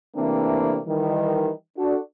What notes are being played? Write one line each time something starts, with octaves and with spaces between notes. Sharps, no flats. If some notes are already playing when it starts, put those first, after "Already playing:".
C3 E3 A3 A#3 C4 D4
D#3 E3 G3
D4 F#4 A4